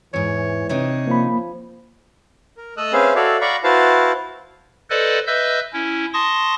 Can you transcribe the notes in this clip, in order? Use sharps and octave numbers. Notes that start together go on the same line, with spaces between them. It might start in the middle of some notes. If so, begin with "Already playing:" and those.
E2 G#2 E3 C#5
C3 D4 D#4 C#5
F3 A#3 B5
A#4
A3 A4 D#5 D#6 E6 F#6
C4 C#4 G#4 B4 E5 F5
F#4 A4 C#5 D5 E5 F5
D5 F5 F#5 A#5 B5 C#6
E4 F#4 B4 C5 F5 A5
A4 B4 C5 D5 D#5 F#5
B4 D#5 E5 E6 G6
C#4 E4
A5 C6 C#6 D#6 A#6